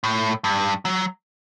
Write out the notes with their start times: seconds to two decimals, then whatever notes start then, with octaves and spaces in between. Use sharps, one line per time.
0.04 A2
0.44 G2
0.85 F#3